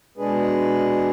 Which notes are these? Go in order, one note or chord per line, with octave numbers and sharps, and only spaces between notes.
B2 G#3 D4 G#4 B4